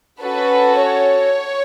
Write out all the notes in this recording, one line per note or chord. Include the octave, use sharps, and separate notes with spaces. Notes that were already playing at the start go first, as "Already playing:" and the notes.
C#4 F#4 A4 B4
C#5